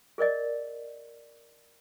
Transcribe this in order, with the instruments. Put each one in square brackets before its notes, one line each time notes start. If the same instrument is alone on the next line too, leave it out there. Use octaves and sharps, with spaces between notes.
[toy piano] G#4 A#4 D5 D#5